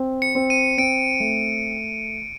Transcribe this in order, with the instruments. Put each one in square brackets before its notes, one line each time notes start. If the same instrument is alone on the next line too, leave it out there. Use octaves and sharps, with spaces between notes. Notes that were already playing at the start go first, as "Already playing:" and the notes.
Already playing: [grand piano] C4
[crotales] C#7
[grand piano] C4
[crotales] D#7
[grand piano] C4 [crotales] D7
[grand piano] A3